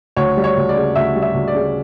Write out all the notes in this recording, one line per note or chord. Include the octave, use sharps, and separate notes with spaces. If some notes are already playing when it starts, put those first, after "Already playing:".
D2 C#5
G3
C#5
D2
D5
C#3
D2 E5
G3
E5
D2
D5
C#3